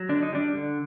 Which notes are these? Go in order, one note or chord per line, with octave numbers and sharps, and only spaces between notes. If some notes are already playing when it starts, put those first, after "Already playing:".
Already playing: F#3
D3 D4
D#4
G3 D4
D3